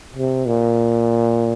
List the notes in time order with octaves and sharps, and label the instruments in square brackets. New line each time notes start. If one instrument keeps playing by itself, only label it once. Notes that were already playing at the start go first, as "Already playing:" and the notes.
[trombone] C3
A#2